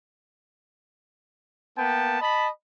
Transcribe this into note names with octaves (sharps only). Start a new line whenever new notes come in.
A#3 B3 G5 A5
D#5 A5 B5